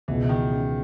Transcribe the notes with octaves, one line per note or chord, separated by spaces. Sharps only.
C#2 B2 E3 G#3
E3
D#3
C#3